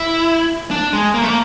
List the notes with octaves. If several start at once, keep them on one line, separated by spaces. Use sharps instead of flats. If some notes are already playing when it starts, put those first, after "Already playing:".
Already playing: E4
D4
G#3
A#3
A3
A#3